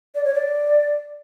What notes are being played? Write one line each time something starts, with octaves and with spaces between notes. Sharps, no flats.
D5
C#5
D5